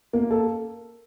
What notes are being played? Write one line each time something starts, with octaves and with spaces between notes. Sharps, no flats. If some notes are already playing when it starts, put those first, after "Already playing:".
A#3
A4